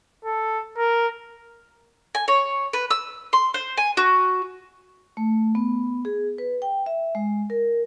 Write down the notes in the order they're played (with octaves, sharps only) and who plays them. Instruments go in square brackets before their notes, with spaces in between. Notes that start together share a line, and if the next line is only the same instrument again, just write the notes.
[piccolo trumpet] A4
A#4
[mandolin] G#5
C#5
B4
E6
C6
C5
G#5
F#4
[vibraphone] A3
B3
G#4
B4
G5
E5
G#3
A#4